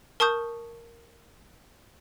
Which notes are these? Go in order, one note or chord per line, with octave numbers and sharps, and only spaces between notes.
A#4 A5 C#6 D#6 G6